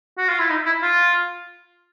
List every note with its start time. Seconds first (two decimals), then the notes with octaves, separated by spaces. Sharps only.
0.18 F#4
0.29 F4
0.39 E4
0.49 D#4
0.66 E4
0.82 F4